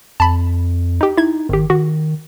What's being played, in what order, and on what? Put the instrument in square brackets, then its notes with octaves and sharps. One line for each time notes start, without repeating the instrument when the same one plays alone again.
[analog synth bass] F2 [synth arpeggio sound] A5 B5
[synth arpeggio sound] D#4 G4
[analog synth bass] D#4 [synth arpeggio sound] E4 G#6
[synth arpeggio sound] G#1 G4 [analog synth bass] D#3
[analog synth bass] D#3 [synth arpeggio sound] F#4